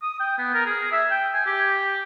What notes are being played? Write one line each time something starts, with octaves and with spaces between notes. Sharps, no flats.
D#6
G5
B3
A#4
G#4
E5
G5
G#5
G4